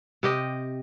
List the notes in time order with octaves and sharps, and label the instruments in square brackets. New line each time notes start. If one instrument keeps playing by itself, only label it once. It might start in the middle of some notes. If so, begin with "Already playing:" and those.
[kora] C3 G4 D#5